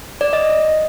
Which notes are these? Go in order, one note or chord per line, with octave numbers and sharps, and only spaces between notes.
D5
D#5